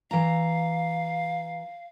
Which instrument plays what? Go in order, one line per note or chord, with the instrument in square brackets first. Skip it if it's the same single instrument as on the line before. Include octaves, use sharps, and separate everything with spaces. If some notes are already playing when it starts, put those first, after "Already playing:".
[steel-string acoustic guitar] E3 A#5 [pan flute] F5